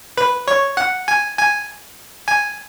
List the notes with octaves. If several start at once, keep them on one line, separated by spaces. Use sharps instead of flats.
B4
C#5
F#5
G#5
G#5
G#5